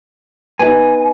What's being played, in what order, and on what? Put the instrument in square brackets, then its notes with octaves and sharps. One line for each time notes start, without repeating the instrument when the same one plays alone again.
[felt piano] B3 D#4 [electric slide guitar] G#5